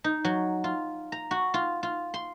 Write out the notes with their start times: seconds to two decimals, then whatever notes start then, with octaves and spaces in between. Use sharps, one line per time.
0.04 D#4
0.25 F#3
0.64 F4
1.12 A#5
1.31 F#4
1.54 F4
1.83 F4
2.14 C6